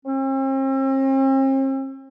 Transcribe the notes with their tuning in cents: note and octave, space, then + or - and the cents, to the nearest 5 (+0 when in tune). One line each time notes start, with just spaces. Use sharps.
C4 +45